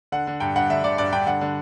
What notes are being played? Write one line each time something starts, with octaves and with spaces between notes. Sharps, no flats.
D3 F#5
D3
G2 G5
G2 F#5
D3 E5
D3 D5
G2 D5
G2 G5
D3 F#5
D3